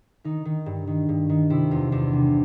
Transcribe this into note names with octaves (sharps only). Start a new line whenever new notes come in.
D#3 D#4
D#3
G2
D#3
G2
D#3
C3 E4
E2 F4
E2 D4
C3